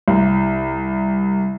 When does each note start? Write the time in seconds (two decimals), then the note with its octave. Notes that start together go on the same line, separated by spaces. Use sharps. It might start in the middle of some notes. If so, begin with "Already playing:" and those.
0.08 C2